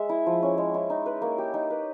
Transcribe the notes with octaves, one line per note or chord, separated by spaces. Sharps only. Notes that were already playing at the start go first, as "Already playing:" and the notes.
Already playing: G#3 G#4 C#5 E5
E4
F3
C#4
G#3
E4
D#4
B4
A#3
G4
D#4
B4